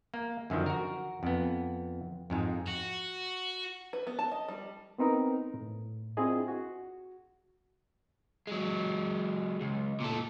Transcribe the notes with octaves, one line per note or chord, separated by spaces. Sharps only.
A#3
F#2 D3 D#3 F3
F#4 A#4
F2 B3
F2 G#2 G#3
F#4
B4
B3
A5
D#5
G3
B3 C4 D#4 A#4 B4
A2
C4 D4 E4 F4 G#4 D#5
F#4
F#3 G#3
C#2
A#2 A4